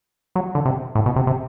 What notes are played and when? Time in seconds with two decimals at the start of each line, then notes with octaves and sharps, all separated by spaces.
0.36 F#3
0.55 D3
0.66 C3
0.95 A2
1.06 B2
1.16 C3
1.27 C3